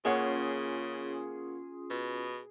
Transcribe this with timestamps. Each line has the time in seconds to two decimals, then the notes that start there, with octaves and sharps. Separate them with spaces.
0.05 C#3 A#3 C#4 F4 G#4 C#5 F#5 C6
1.90 B2